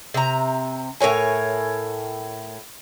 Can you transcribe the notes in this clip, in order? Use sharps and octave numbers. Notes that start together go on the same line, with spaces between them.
C3 A#5
A2 A#4 C#5 G#5